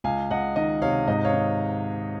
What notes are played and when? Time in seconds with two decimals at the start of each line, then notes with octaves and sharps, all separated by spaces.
0.04 C#2 F5 G#5
0.30 C#2 D#5 F#5
0.56 D#3 D#5
0.82 C3 C#5 F5
1.07 G#2 D#5
1.25 C#5 F5
1.33 D#3